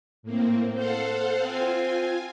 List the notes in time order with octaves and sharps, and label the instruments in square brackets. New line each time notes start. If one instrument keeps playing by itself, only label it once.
[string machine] A2 A#3 C4
[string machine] A4 F5 F#5 [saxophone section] C5
[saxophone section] C4 [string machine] F4 G#5